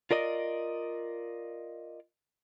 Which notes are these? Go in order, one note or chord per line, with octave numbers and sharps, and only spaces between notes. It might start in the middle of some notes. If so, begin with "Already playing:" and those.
F4 A#4 D5 D#5